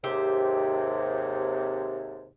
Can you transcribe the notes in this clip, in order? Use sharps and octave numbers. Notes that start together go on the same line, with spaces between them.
D#2 G#2 C3 G4 C5 E5